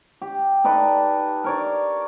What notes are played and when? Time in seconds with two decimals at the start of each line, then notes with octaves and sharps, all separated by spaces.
0.22 G4
0.64 D#4 A4 B4 D5
1.44 A#4 C#5 D5